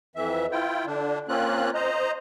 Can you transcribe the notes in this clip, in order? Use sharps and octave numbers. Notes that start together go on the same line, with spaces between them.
F2 E3 E5
E4 F4 G5
D3 D4
A#3 C4 C#4 F4 F#6
C5 D#5 A#5